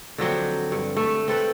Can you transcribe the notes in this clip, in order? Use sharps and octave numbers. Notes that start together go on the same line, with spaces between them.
D3 F3 F#3 C4
G2
A3
C4 A4 B4